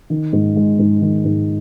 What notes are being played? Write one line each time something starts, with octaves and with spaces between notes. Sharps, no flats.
D#3
G#2
G#3
G#2
D#3
G#2